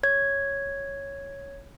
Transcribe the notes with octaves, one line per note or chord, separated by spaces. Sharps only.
C#5 G#6